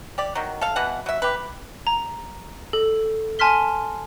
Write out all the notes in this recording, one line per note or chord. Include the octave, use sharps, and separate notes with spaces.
G4 D5
D#3 F#3
A4 F5
B2 E3 F#5
F#3 E5
G4 B4
A#5
A4
G#5 A5 C6 F6 B6 G7